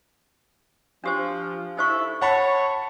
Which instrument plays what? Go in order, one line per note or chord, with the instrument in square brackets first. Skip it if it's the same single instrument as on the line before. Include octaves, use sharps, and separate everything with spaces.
[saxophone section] F3 [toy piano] D4 G4 C5
[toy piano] D#4 C5 C#6 [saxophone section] E4 A4
[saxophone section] C#5 [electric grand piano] F#5 A5 B5